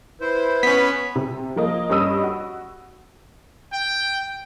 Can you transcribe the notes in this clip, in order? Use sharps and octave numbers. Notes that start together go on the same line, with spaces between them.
E4 B4 C5
B3 C#4 B6
C3
F3 A#3 D#5
G2 C#4 D#5 D#6 E6 D#7
F#4
G5